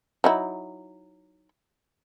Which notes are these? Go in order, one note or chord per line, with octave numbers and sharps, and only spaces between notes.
F#3 D#4 E4